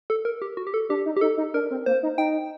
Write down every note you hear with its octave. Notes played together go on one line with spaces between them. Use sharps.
A4
A#4
G4
F#4
G4
A4
D4 G4
D#4
G4
D#4 A4
D#4
D4 A#4
C4
A#3 C5
D#4
D#4 G5